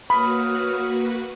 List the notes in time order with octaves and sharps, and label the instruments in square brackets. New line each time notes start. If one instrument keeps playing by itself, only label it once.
[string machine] A#3 F#4 B4 [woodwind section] C#5 D#6 F6 [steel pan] B5